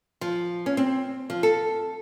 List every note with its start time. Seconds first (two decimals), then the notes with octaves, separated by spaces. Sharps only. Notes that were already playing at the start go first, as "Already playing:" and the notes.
0.21 F3
0.66 C#4
0.77 C4
1.30 F3
1.43 A4